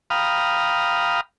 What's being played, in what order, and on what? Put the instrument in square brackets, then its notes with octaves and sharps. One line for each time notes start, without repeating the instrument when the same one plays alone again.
[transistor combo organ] F5 G5 A#5 B5 D#6 F6